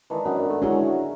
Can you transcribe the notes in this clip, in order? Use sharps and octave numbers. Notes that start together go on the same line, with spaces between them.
D#3 E3 G#3 D4 A5
F#2 B3 D4
A3
F#3 G#3 C#4 D4 E4 G#4 F#5 A#5
E5